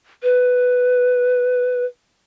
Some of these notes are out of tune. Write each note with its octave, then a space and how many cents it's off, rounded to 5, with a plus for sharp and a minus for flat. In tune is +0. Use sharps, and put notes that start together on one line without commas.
B4 +5